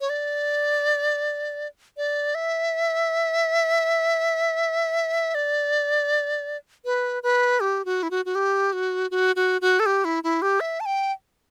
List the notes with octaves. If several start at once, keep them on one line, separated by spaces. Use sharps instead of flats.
C#5
D5
D5
E5
D5
B4
B4
G4
F#4
E4
F#4
F#4
G4
F#4
F#4
F#4
F#4
A4
G4
E4
E4
G4
E5
A5
G5